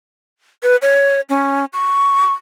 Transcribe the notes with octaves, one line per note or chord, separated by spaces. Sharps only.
B4
C#5
C#4
C#6